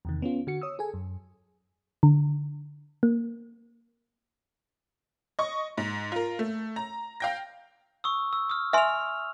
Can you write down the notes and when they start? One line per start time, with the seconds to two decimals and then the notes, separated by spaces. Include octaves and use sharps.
0.05 E2 C3 D#3
0.22 B3 C#4 F4
0.47 D3 F#4 C#7
0.62 C#5 D#6 E6
0.79 G#4 A4 G#5
0.94 F#2
2.03 D3
3.03 A#3
5.39 D#5 C#6
5.78 G#2
6.12 F4 A#4
6.39 A3
6.76 A#5
7.20 F5 G5 A#6
8.04 C#6 D#6 E6
8.33 E6
8.50 D#6 F6
8.73 E5 G#5 C6 F6 F7